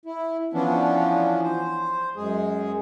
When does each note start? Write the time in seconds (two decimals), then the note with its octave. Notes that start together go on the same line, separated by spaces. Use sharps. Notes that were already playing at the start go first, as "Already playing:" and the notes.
0.06 E4
0.54 E3 F3 B3 C#4 D4
1.43 C5
2.16 F#2 G#3 G#4